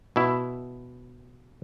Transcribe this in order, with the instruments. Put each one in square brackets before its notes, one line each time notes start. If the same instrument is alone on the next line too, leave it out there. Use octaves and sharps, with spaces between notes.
[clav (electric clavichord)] B2 E4